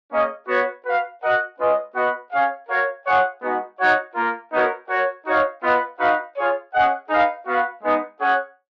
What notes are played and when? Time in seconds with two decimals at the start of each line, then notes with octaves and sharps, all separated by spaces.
0.11 A#3 C#4 G#4 D#5
0.48 B3 F#4 C#5
0.85 F#4 B4 F5
1.22 F#4 A#4 D#5 F#5
1.58 G#3 C#4 F4 B4 D#5
1.95 B3 F#4 B4 D#5 F#5
2.31 C#4 G#4 C#5 F5
2.69 F#4 A#4 C#5 F5
3.05 F4 G#4 C#5 F#5
3.42 G#3 B3 D#4 F#4
3.78 D#4 F#4 C#5 F#5
4.15 A#3 F4 A#4
4.52 B3 D#4 F#4 A#4 C#5
4.88 F#4 A#4 C#5
5.26 D#4 F#4 C#5 F5
5.62 B3 F4 B4 D#5 F#5
5.99 D#4 F#4 B4 F5
6.35 F4 G#4 C#5
6.73 C#4 G#4 D#5 F#5
7.09 D#4 G#4 B4 F5
7.46 B3 F#4 B4 F5
7.82 G#3 B3 D#4
8.19 C#4 G#4 C#5 F#5